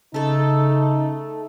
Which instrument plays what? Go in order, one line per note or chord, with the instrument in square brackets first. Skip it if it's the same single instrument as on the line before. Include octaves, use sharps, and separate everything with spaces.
[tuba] C#3 [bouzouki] A3 A4 [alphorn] D#4